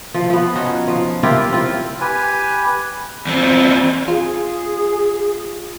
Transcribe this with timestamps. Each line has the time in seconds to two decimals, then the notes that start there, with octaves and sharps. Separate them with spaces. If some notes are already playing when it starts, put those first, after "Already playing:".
0.14 F3
0.30 F3 B3
0.55 C#4 D#4 F#4
0.87 F3
1.23 E4 F4 G4 A#4
1.52 C4 F4
2.01 G4 B4 G#5
3.27 E2 C4
4.08 F4 G#4